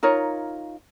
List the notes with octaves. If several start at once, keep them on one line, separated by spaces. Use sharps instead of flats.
D#4 F4 A#4 C#5